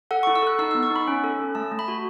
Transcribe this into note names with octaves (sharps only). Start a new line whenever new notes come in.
A4 F#5
C#6
E4
E6
A4 F#6
D#4 E6
E6
B3
C#6
D#4
B5
C#4
A4
C#4
A3 A5
A3
B5
F#4